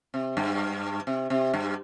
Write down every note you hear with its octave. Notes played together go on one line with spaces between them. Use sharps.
C3
G2
C3
C3
G2